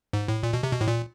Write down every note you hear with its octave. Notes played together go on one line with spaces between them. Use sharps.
G#2
A2
A#2
B2
C3
B2
A2
A#2